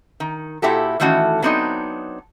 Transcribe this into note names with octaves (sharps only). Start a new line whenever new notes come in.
D#3
A#2 E4 F#4 G4 A4
A2 D#3 E3 A3 C#4 F#4
F#3 B3 C4 D4 D#4